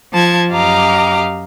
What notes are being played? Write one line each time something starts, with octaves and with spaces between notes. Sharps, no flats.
F3 A5 G#6
F#2 G4 D#5 F5 A#5 D6